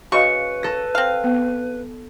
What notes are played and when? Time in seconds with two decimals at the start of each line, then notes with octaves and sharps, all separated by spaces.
0.12 C#3 F#4 B4 D#5 F5 C#6
0.63 A4 A#6
0.95 C4 F5
1.24 B3